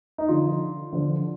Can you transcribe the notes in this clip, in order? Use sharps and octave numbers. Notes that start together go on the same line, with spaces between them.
D#4
D3 F3 F4
D3 F3